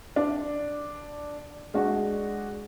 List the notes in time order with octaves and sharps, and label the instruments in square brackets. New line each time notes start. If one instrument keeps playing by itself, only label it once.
[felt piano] D4
G#3 D4 F#4